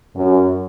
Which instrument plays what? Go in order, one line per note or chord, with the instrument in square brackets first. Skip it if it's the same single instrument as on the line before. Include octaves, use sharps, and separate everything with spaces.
[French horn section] F#2